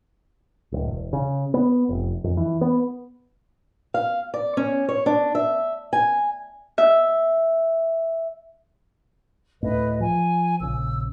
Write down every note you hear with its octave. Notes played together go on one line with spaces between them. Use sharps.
D1
E1
C#3
B3
F1
F2
E3
B3
F5
D5
C#4
C#5
D4
E5
G#5
E5
D1 A2 B4 D#5
F3 G#5
A#1 C#3 E6